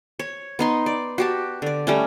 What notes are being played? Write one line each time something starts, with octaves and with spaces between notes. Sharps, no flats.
C#5
B3 D#4 C6
D5
F#4 G4 A5
D3 D5
G3 A3 C#4